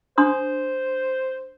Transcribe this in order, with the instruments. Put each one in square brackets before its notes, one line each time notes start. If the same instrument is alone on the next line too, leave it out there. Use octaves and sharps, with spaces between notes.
[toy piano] D4 C6 D#6 [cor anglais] C5